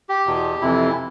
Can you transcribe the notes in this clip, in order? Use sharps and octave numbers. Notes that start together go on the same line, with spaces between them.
G4
E2 B2
F2 C3 E3 E4